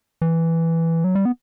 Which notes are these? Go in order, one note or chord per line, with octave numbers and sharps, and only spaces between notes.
E3
F#3
G3
B3